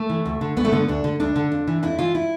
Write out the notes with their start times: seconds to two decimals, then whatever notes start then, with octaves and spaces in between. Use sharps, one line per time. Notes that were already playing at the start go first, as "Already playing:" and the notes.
Already playing: A3
0.09 E3
0.26 D2
0.41 D3
0.57 D2 B3
0.65 A3
0.72 D3 B3
0.88 D2 D4
1.04 D3
1.20 D2 D4
1.36 D3
1.52 F2
1.67 E3
1.83 F2 E4
1.98 E3 F4
2.15 E4